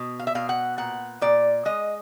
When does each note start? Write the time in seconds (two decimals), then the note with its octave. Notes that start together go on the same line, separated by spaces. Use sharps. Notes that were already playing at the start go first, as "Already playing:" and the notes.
Already playing: B2
0.19 F5
0.27 E5
0.35 B2 F5
0.49 F#5
0.78 A#2 F#5
1.21 A#2 D5
1.65 G#3 D#5